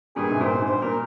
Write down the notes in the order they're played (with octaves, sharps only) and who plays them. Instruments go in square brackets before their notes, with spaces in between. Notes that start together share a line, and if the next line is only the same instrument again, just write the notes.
[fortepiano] G2 A#2 [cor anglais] G#4
[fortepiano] G#2 C3
[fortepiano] G2 A#2 [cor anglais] C5
[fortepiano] G#2
[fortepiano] G2 [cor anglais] C5
[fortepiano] A#2 [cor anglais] A#4